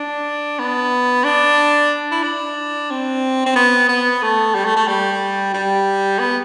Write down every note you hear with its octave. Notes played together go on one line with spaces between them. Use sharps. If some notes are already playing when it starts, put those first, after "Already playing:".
Already playing: D4
B3
D4
E4
D4
C4
C4
B3
B3
A3
G3
A3
A3
G3
G3
B3